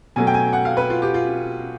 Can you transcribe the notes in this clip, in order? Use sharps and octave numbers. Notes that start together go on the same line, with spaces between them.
B2 F#3 A3 G#5
G5
G#5
F#5
F5
B4
F4
G4
F4